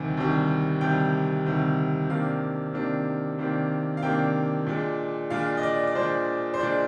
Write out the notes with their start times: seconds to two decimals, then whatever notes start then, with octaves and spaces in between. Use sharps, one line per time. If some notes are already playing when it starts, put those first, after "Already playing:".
Already playing: D2 C3 D#3 G3 G#5
0.17 D2 C3 D#3 G3
0.81 D2 C3 D#3 G3 G5
1.46 D2 C3 D#3 G3
2.09 C3 D#3 A#3 D4 F5
2.74 C3 D#3 A#3 D4
3.39 C3 D#3 A#3 D4
3.97 F5
4.03 C3 D#3 A#3 D4 G5
4.67 A#2 G#3 D4
5.30 A#2 G#3 D4 F5
5.57 D#5
5.63 D5
5.87 D5
5.95 A#2 G#3 D4 C5
6.54 C5
6.59 A#2 G#3 D4 D5